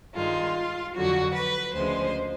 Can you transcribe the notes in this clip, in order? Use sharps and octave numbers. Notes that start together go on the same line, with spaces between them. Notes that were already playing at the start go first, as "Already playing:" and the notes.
G2 D#3 G#3 F4
F2 D3 F#3 F#4
B4
D2 C#3 F3 G#3 C5